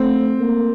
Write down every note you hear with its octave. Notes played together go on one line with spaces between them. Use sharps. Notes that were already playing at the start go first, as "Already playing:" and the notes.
Already playing: A3 C4
A#3